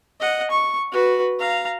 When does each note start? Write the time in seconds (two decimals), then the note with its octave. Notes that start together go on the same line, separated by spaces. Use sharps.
0.20 D#5 F#5
0.51 C#6
0.92 F#4 B4
1.39 F5 A#5